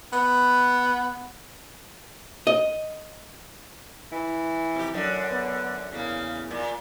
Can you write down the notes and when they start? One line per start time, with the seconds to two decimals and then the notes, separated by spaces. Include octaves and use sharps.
0.12 B3
2.47 D#5
4.12 E3
4.76 C3 G4
4.94 F#2 D3
5.30 B3
5.92 E2 C#3 A#3
6.51 A#2